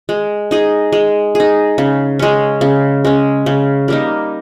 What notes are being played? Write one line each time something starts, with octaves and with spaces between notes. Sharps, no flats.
G#3
D#4 G#4
G#3
D#4 G#4
C#3
G#3 C#4
C#3
G#3 C#4
C#3
G3 A#3 D#4